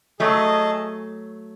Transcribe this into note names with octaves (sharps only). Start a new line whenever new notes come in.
F#3 A3 G#4 D#5 A5